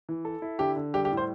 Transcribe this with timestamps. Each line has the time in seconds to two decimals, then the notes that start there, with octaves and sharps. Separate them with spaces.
0.09 E3
0.25 A4
0.42 E4
0.59 D3 G4
0.76 D3
0.94 G3 G4
1.05 G4
1.12 A2
1.17 C5